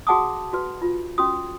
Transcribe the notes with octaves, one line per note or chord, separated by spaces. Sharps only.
F#4 G#4 F#5 A5 D6 D#6
F#4 B4
F4
C#4 F#4 D#6